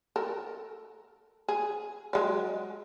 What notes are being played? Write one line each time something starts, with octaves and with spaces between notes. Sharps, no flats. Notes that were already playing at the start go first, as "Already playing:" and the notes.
A4 A#4
G#4
F#3 G#3 D5